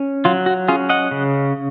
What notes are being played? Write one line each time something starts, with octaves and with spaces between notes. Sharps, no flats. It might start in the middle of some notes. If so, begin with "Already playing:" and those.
Already playing: C#4
F#3 F4
F#4
C#4 F4 G#4
D#5 F#5
C#3